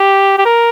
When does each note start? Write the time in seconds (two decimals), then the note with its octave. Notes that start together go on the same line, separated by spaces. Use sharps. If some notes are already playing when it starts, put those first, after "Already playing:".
Already playing: G4
0.38 G4
0.45 A#4